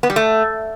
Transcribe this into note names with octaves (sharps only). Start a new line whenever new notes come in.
B3
G3
A3